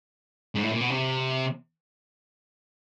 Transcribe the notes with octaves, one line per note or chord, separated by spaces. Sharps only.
G#2
A2
A#2
B2
C3